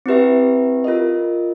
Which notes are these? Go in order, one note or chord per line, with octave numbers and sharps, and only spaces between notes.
C4 E4 G4 B4 E5
F4 A#4 D#5